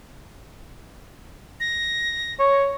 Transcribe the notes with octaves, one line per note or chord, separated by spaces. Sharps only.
A#6
C#5